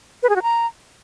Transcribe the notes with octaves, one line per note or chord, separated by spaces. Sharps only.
B4
G#4
F#4
A#5